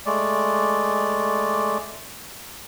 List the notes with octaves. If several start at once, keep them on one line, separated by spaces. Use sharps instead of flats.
G#3 A3 D5